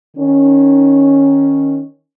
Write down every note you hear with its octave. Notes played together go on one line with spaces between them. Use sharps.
D#3 C#4